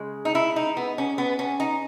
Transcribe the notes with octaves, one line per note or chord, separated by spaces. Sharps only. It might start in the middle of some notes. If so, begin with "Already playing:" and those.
Already playing: C#3 G#3
D#4
E4
D#4
B3
C#4
B3
C#4
D#4